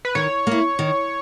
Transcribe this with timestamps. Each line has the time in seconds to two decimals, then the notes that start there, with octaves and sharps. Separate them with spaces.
0.05 B4
0.15 D#3 C#5
0.47 A#3 E4
0.79 D#3